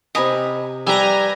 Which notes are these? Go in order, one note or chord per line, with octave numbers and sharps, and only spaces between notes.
C3 D#5 G#5 A#5 B5
G3 B4 E5 G5 G#5 A#5 A#6